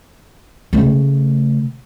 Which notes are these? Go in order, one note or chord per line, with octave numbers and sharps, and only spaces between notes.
C#3 A3